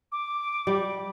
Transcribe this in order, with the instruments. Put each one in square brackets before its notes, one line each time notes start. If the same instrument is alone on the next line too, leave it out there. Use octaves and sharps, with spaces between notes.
[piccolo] D6
[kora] G3